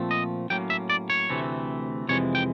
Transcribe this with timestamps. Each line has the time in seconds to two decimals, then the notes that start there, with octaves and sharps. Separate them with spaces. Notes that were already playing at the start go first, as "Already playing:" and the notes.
Already playing: A#2 F3 A3 C4
0.11 D#5
0.50 A2 F#3 A#3 C#4 G5
0.70 E5
0.90 D5
1.10 C#5
1.29 D2 C3 E3 A3 C4
2.09 F2 C3 E3 G#3 C#5
2.35 G5